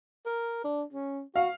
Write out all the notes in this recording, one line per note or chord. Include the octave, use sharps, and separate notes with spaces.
A#4
D4
C#4
F#4 F5